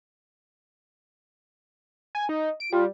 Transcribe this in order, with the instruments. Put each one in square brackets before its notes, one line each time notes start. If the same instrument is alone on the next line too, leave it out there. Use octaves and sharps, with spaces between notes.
[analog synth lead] G#5
D#4
D7
[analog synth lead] G3 [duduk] F4